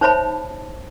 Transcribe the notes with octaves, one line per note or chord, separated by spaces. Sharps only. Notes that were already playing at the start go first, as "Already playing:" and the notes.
D#4 C5 C#5 E5 A5 B5